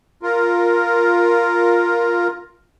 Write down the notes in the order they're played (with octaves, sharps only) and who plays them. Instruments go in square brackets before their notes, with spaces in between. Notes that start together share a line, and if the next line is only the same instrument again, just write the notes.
[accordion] F4 A#4